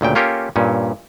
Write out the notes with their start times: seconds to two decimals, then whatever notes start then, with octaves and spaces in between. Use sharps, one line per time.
0.01 D2 A#2 C#3 G5
0.15 A#3 C#4 F4 G4 A4 A#4
0.56 G2 A#2 C#4